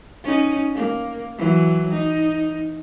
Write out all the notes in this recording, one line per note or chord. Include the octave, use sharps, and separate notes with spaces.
C#4 D#4
A#3
E3 F#3
D#4